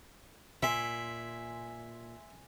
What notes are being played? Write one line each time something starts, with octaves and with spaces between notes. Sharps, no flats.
A#2 E5 G#5 C6